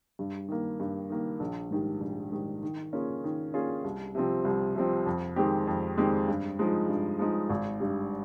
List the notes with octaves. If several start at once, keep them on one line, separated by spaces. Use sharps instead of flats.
G2
D#3 A#3
G2
D#3 A#3
A#1
G#2 D#3 G3
A#1
G#2 D#3 G3
D#3
A#3 C#4 F4 G#4
D#3
A#3 C#4 F4 G#4
C2
C3 F3 C4
C2
C3 F3 C4
F2
D#3 G#3 C4 G4
F2
D#3 G#3 C4 G4
G2
F3 G#3 D#4
G2
F3 G#3 D#4
G#1
G2 G3